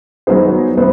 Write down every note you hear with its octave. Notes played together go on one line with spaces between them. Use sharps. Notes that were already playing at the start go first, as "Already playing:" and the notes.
F#3 B3 D#4 G#4 C5
F#3 B3 C5